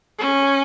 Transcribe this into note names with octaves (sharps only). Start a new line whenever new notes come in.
C#4